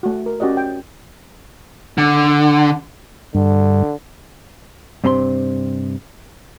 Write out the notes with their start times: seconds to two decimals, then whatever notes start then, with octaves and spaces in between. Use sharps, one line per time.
0.03 A3 F#4
0.26 A#4
0.40 C#4 F#4 G4 D5 D#5
0.57 G5
1.98 D3
3.35 G2 D3
5.04 G2 C3 C4 A#5 C6